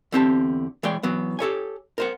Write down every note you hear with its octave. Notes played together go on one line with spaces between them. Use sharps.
E2 D3 C4 G4 F#5 A5
E3 G#3 C#5 D5 G5
E3 F#3 B3
G4 A4 C#5 G#5
A#4 C5 F#5